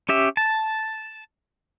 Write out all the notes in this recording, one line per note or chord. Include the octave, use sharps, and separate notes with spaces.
C#4 G4 E5
A5